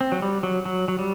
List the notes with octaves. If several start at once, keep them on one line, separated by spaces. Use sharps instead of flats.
C4
F#3
G3
F#3
F#3
F#3
G3